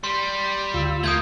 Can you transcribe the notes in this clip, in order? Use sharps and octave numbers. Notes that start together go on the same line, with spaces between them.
G3 C6
D2 F4 E6
A3 A#3 D#6 G6 G#6